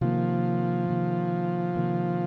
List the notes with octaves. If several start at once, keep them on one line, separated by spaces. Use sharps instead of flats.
C3 D#3 F3 A#3
C3 D#3 A#3
C3 D#3 A#3